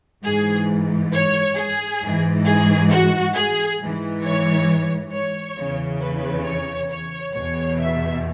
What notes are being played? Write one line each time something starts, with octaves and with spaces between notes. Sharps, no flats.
G#2 E3 G#4
C#5
G#4
G#2 E3
G#4
F#4
G#4
G#2 E3
C#5
C#5
E2 C#3 E3
B4
C#5
C#5
E2 B2 C#5
E5